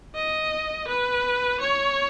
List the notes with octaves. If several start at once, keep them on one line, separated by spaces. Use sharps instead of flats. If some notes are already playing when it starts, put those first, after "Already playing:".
D#5
B4
C#5